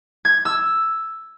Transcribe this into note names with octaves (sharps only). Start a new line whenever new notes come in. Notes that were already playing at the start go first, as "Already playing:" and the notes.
G#6
E6